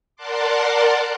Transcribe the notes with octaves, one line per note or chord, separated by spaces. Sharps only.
A#4 D5 F#5 A5 C6 D6